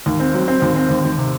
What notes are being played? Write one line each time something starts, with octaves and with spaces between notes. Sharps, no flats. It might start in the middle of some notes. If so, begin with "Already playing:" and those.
D#2
C4
F#3
C4
D#2
C4
D#2
D#2
C3